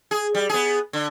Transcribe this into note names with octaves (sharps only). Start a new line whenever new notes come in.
G#4
G3
B3 G#4
D3